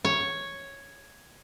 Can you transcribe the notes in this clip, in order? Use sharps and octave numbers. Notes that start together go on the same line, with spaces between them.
C#5